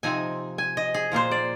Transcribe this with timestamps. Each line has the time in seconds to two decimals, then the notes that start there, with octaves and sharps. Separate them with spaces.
0.03 C3 F3 C4 D#4 G#5
0.58 G#5
0.77 D#5
0.94 G#4
1.12 A#2 F3 A#3 C5
1.31 D5